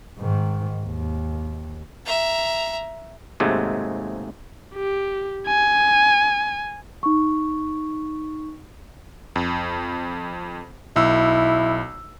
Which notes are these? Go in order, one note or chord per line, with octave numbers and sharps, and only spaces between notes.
G#2 D#3
D#2
E5 A#5
D#2 G#2 C3 F#3 G#3 A3
G4
G#5
D#4 C#6
F2
B1 E4 E6